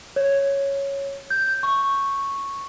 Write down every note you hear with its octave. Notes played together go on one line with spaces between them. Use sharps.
C#5
G6
C#6